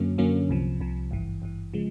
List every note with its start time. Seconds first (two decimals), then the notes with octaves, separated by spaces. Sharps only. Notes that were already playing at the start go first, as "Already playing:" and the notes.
Already playing: F#2 D3 F#3 A#3 C#4
0.18 F#2 D3 F#3 A#3 C#4
0.49 C2 C3 F3
0.80 C2 C3 F3
1.11 G#1 G2 E3
1.42 G#1 G2 E3
1.74 C#3 F3 G#3